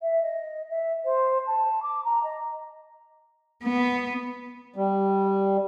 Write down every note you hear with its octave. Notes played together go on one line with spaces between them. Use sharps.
E5
D#5
E5
C5
A5
D6
A#5
D#5
B3
G3